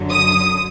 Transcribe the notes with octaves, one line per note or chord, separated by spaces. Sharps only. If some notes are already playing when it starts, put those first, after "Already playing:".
Already playing: F#2 D3 F#3
D#6